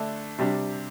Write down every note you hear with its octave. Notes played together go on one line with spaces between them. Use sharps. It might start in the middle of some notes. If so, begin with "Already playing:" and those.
Already playing: D3 A3 D4 A4
C3 G3 D4